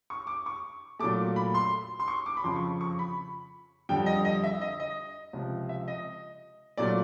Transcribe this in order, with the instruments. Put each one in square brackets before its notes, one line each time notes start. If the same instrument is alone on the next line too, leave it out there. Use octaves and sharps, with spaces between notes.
[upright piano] C#6
D6
C#6
A#2 F#3 A3 D6
B5
C6
C6
C#6
D6
B5
F2 C#3 F3 C6
C#6
C#6
B5
F2 D3 G3 G5
D#5
D#5
E5
D#5
D#5
C#2 C3 F3
E5
D#5
A#2 F#3 A3 D5